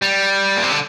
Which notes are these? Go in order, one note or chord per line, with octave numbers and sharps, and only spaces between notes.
G3
A#2
C3
D3